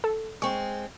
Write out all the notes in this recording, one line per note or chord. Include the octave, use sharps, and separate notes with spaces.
A4
G#3 C4 C#6